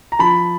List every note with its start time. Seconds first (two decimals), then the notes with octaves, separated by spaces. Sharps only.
0.12 A#5
0.19 F3 A5 B5